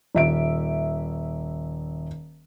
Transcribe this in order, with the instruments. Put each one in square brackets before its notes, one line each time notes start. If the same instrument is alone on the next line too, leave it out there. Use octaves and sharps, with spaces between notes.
[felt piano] D#1 E5 D7